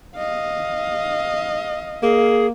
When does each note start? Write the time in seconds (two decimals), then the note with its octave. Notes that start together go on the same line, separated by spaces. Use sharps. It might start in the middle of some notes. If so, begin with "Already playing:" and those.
0.17 D#5 F5
2.03 A#3 G#4